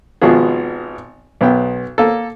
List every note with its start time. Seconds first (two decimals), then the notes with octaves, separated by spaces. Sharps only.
0.22 G#1 B2 F3 B3 G#4
1.41 B1 B3 G5
1.98 A#3 A4